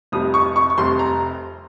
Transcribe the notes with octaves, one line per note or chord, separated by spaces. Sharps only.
F1 F2 C3 G3 D#6
C#6
C#6
C#6
F1 F2 C3 G3 C6
A#5